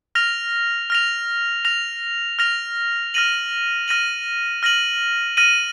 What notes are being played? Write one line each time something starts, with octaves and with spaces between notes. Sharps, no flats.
F6 A#6 F7
F6 A#6 F7
F6 A#6 F7
F6 A#6 F7
F6 A#6 D#7 F#7
F6 A#6 D#7 F#7
F6 A#6 D#7 F#7
F6 A#6 D#7 F#7